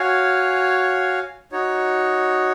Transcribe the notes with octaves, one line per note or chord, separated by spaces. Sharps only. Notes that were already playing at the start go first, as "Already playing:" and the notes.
Already playing: F#4 C#5 F5 G#5
D#4 F#4 C#5